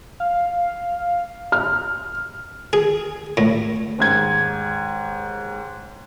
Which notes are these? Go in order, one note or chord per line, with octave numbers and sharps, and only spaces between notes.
F5
F6
G#4
A2
D#2 G#2 G#6